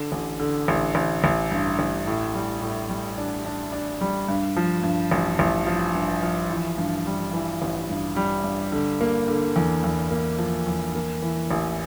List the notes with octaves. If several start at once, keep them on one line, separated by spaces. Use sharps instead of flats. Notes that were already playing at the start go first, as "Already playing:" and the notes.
Already playing: D3
A1
D3
A1
A1
A1
G2
A1
A2
G3
A2
G3
D4
D4
D4
G3
G2
F3
G2
A1
A1
F3
G2
F3
E3
G2
G3
E3
A1
G2
G3
G2
D3
A#3
D3
E2
E2
A#3
F3
E2
A#3
E3
A1